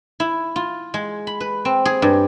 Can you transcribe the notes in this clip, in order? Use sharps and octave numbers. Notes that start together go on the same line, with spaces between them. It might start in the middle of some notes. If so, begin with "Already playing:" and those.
E4
F4
G#3
B5
B4
C4
G#4
G2